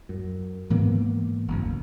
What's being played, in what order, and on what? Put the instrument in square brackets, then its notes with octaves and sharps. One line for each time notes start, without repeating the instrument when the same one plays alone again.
[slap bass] F#2
G#2 E3 A#3 B3
F#1 D2